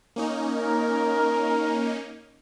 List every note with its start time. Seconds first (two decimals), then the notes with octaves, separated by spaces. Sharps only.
0.16 A#3 C#4 D#4
0.55 A#4